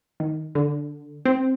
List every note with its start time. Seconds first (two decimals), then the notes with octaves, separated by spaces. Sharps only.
0.20 D#3
0.55 D3
1.25 C4